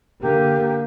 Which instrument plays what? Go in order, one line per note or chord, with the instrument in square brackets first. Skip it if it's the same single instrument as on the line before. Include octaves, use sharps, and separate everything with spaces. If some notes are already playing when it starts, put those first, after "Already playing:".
[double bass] D3 A#3 [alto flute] G4